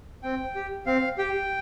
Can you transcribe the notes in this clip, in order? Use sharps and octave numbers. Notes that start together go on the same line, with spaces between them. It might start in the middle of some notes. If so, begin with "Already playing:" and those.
C4 G5
G4
C4 F5
G4 G5